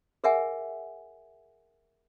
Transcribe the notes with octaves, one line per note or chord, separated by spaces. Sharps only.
G#4 A#4 E5 F#5 G#5